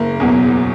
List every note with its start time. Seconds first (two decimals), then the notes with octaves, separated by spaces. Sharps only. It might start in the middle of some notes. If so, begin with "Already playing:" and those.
Already playing: F#1 A#3 A#4
0.20 E2 B2 F#3